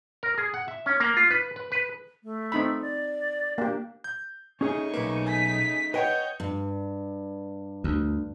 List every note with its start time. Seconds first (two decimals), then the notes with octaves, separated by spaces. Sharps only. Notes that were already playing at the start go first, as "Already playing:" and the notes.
0.23 A#4
0.38 G#4
0.54 F#5
0.68 E5
0.86 C#4
1.00 A#3
1.17 F4
1.31 B4
1.56 B4
1.72 B4
2.23 A3
2.52 C4 D#4 B5
2.81 D5
3.58 A#3 D4 G4
4.04 G6
4.61 C#3 A3 C#4 D#4 G#4 G#5 C#6
4.94 B1 A#3 B4
5.27 G#5 B6
5.94 B4 C#5 D#5 F#5 G5 G6
6.40 G2
7.84 D2